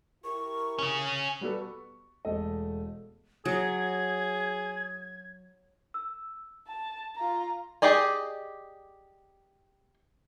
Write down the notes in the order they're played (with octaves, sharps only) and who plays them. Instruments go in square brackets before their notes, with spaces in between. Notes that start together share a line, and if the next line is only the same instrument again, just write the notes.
[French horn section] E4 G4 A#4 [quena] C#6
[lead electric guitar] C#4 G#4
[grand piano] G3 B3 F#4 G4 A4 B4
C#6
E1 A3 A4 D#5
[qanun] F#3 [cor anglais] G#4 [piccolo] G#6
[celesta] E6
[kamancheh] A5
F4 A#5
[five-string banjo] G4 G#4 D5 D#5 G#5